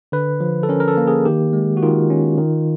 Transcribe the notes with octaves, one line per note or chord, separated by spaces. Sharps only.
D3 B4
F3
A4
C#4 A#4
A#4
A4
A#3
G#4
D#3 G4
G#3
F#4
D#3 F4
C#4
D#3